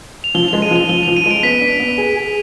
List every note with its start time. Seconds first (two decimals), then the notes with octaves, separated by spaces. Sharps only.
0.24 F7
0.35 F3 G7
0.48 G#3 F7
0.62 D#7
0.71 F3 F7
0.89 F3 G7
1.03 F3 F7
1.17 D#7
1.26 G#3 D7
1.43 B3 B6
1.62 D4
1.80 B3
1.98 G#4
2.16 G#4